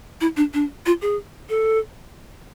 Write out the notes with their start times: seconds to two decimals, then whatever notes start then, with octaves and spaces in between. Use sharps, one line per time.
0.21 E4
0.37 D4
0.54 D4
0.86 F4
1.02 G#4
1.49 A4